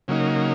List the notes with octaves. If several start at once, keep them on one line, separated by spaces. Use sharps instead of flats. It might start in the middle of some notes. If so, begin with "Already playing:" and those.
C#3 F#3 A#3 D#4